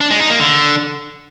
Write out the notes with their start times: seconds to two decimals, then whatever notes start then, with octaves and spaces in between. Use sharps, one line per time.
0.01 D4
0.11 G#3
0.20 D#4
0.30 A#3
0.40 D3